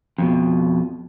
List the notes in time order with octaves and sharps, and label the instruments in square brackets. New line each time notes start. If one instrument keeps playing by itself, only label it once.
[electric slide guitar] F2 B2